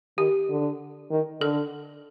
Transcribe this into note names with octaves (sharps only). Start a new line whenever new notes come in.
D#3 G4
D3
D#3
D3 A4